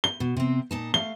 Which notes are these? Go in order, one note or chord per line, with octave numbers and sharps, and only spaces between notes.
G7
B2
C3 C4
A#2 D#4 A5
A3 F5 G7